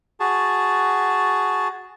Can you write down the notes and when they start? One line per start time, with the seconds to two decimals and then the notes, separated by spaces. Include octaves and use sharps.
0.20 F#4 G#4 A5